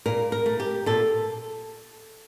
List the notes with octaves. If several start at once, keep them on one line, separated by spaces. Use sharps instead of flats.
A#2 A#4
A#4
A3
G4
A#2 A4